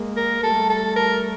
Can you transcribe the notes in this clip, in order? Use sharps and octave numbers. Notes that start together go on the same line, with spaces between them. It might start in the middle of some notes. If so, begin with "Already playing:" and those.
Already playing: G#3 A#3
A#4
G3 A3 A4
A4
A#4